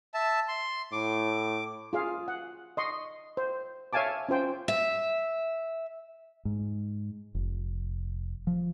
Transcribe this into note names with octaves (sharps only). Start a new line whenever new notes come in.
E5 A5
C6
A2 D6
F4 G#4 F5
F#5
D#5 C6 C#6
C5
C#5 E5 F5 G#5 A5 D6
C#4 F4 C5 G5
E5
G#2
F1
F3